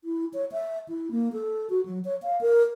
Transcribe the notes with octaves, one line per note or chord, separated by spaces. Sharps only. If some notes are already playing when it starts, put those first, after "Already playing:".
E4
C#5
E5
E4
A#3
A4
F#4
F#3
C#5
F5
A#4